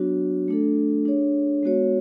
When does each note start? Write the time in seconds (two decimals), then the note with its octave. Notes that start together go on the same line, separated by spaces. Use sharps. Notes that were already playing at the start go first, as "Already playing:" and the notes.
Already playing: F#3 B3 D4 F#4 C#5
0.48 A3 D4 A4
1.05 D4 G#4 C#5
1.63 G#3 B3 F#4 C#5